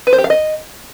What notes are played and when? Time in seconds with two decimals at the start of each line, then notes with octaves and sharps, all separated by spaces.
0.07 B4
0.13 C5
0.18 G4
0.24 F5
0.30 D#5